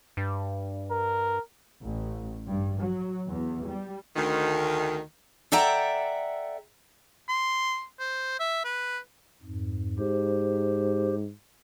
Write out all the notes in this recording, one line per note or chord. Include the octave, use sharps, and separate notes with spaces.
G2
A#4
A1
G2
F#3
E2
G3
D2 D#3
A4 D5 E5 F#5 G5 A#5
C6
C5
E5
B4
F2 G#2
G#2 G4 C5